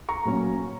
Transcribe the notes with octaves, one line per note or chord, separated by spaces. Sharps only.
A#5 C#6
A#2 F#3 C#4